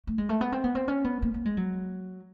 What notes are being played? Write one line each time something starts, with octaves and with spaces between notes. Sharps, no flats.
A3
G#3
A3
B3
C4
B3
C4
C#4
B3
A#3
A#3
G#3
F#3